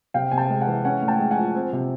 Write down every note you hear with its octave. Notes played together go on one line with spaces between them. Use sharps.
C3 F5 G5
C3 G#5
G5 A5
G#3
F#5 G#5
E3
C#4 F#5 G#5
A2
G5 A5
G#3
F#5 G#5
F3
C4
C3